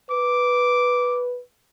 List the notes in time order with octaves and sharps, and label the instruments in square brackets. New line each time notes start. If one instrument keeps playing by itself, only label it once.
[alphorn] B4 [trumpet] D6